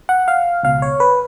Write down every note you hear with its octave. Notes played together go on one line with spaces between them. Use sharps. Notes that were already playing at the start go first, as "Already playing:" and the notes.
F#5
F5
C#2 B2 F5
C#5
B4